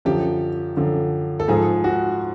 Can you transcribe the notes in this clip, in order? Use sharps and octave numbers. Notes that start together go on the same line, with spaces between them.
F#2 D3 F3 G4
F#2 D3 F3
A4
G#2 F3 G#4
F#4